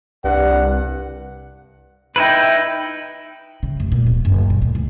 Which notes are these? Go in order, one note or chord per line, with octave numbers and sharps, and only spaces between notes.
C2 G2 F#5
D#4 E4 B4 E5 G5
C#3
F1
A#2
D1
F#1
A#2
D2
C#2